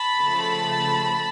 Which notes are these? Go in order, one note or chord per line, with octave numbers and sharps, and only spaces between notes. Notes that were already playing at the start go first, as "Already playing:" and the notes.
Already playing: A5 B5
C#3 F3 A3